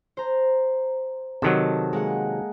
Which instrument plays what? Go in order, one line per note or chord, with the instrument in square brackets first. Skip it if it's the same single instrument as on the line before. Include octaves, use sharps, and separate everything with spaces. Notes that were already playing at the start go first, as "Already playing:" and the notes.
[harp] C5 A#5
[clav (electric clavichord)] C3 D#3 F#3 [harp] A4 D#5
[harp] G#3 A#3 F#5